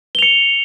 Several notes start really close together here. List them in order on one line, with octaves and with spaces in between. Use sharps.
G7 F7 C#7